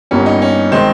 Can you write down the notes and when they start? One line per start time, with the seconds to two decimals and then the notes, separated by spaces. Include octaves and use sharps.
0.11 G1 G2 G3 A#3 C#4
0.26 D#4
0.42 C#4
0.72 D#3 G#3 C4 D#4